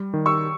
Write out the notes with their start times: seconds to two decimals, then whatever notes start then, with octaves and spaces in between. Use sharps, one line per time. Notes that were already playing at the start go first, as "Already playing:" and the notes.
Already playing: G3
0.14 D#3
0.26 C#6 E6